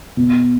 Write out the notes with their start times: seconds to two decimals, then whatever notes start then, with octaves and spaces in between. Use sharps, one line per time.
0.17 B2